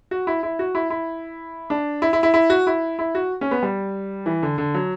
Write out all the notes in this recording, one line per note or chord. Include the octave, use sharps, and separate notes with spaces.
F#4
E4
E4
F#4
E4
E4
D4
E4
E4
E4
E4
F#4
E4
E4
F#4
C#4
B3
G3
E3
D3
D3
F#3